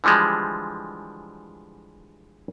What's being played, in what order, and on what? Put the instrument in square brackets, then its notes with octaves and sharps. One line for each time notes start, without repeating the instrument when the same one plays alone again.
[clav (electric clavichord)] D3 E3 F3 G3 G#3